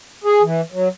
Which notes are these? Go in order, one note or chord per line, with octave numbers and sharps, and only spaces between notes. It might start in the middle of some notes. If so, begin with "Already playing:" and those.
G#4
E3
F#3